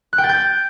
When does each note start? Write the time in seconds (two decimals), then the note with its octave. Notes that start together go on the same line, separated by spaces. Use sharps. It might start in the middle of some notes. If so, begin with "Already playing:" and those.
0.13 F#6
0.18 G5
0.24 A6
0.29 G6